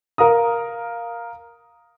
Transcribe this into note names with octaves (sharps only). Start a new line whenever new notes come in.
A#4 F5 A#5 D#6